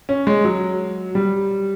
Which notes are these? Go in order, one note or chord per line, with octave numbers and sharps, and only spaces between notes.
C#4
G#3
F#3
G3